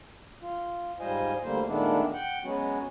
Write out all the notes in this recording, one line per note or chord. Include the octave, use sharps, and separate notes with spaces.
F4
G#2 G3 F4 C5 D#5 G#5
D2 D3 G3 A#3 C5
A#2 D#3 G#3 A3 B3 D4
F#5 G5
F#3 G#3 B3 C#4 F#4